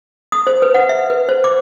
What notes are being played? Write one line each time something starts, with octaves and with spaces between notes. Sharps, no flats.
D#6
C5
B4
F#5
E5
B4
C5
D6